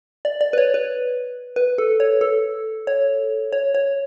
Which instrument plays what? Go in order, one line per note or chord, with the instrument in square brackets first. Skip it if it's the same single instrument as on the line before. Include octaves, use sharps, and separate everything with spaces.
[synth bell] D5
D5
B4
C#5
B4
B4
A4
C#5
A4
C#5
C#5
C#5